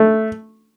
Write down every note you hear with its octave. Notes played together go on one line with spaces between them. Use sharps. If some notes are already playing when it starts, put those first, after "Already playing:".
Already playing: A3